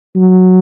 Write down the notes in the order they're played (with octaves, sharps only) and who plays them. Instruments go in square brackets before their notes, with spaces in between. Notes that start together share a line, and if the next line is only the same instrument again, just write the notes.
[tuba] F#3